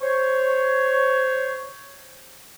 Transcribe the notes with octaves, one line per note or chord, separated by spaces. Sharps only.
C5 C#5